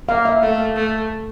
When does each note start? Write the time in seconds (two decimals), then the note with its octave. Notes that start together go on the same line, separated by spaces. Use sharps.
0.08 A#3 F5
0.25 E5
0.42 A3 F5
0.76 A3